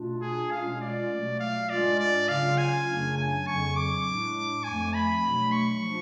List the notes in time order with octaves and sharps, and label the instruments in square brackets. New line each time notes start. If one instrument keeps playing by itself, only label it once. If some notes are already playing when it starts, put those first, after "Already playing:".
Already playing: [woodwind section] B2 A3 D4 F4
[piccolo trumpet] G#4
[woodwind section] B2 G#3 C#4 F4 [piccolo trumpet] F5
[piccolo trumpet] D5
[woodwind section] B2 F#3 A3
[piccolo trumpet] F5
[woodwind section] G#2 G#3 D4 F4 [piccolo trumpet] D5
[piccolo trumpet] D5
[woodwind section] C#3 F#3 C#4 F4 [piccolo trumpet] F5
[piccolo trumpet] G#5
[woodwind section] F#2 C#3 F#3 A3 D4
[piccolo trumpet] G#5
[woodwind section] F2 C#3 F#3 [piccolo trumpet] C#6
[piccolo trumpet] D6
[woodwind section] A2 G#3 D4
[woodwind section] F2 F3 A3 [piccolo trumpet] G#5
[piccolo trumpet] B5
[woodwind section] B2 F#3 A3 D4
[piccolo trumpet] C#6
[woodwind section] F3 A3 D4 F4